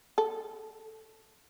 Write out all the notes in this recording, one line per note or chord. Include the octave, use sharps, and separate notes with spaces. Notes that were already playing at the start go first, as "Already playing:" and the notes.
A4